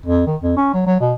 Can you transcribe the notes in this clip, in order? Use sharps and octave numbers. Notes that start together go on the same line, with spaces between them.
F2
D#3
F2
C#4
F#3
F#3
B2